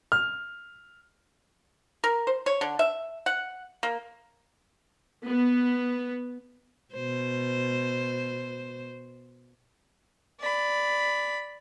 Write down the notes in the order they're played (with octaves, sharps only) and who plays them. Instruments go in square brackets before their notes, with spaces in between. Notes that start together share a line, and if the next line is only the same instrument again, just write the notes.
[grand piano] F6
[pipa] A#4
C5
C#5
D3
E5
F#5
A#3
[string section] B3
[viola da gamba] B2 C5
[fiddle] D5 B5